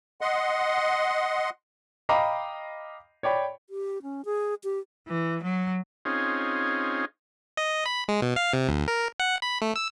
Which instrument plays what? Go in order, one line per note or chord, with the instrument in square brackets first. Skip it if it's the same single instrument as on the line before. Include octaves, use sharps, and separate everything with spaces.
[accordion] D#5 F#5 C6
[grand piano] D#5 F5 G5 A#5 B5 D6
C#5 D5 G5 B5
[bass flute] G4
C#4
G#4
G4
[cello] E3
F#3
[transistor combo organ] C4 C#4 D#4 F4 G#4
[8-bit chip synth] D#5
B5
G#3
B2
F5
C3
D2
A#4
F#5
B5
A3
E6